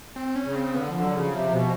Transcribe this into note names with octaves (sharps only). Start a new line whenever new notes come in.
C4
C#4
C#3
C4
D3 B3
F3
D3
F#3
C#3 F3
C3 F3
B2